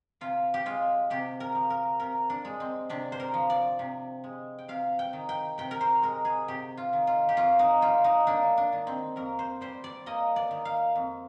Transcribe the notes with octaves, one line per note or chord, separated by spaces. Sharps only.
C3 F4
G4
G#3 F4
C3 G4
A#4
F3
A#4
C3 A#4
D4
G#3
C4
C3 D4
C5
A#4
F3
D5
C3
G#3
G5
C3 F5
G5
D#3
G5
C3 G5
A#4
C5
G#3 A#4
G#4
C3 G4
F4
D#3
F4
G4
F2 F4
D#4
G3 F4
D#4
A#3 D4
D4
D#3
C4
F2 A#4
C5
G3 C5
D5
A#3 D#5
D5
D#3
F5
F2